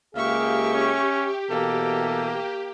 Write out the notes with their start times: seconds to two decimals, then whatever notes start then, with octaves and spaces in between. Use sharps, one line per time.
0.15 C#2 A#3 G4 G#4 E5 F5 C#6
0.73 C#4
1.50 B2 E3 A#3 A4